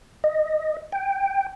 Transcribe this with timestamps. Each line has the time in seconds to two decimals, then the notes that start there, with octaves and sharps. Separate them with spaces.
0.24 D#5
0.92 G5